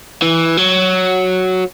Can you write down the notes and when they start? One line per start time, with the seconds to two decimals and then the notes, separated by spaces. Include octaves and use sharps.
0.22 E3
0.57 F#3